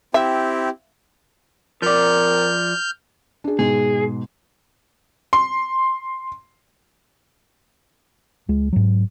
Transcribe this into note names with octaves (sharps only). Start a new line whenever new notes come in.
C4 E4 G4 E5
F3 C4 A#4 D5 F6 G6
D4 G#4
G#2 B2 G#4
C6
C#2 G#3
G#2 F#3